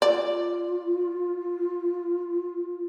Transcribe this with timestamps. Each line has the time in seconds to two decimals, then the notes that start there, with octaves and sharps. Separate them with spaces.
0.02 F4 D5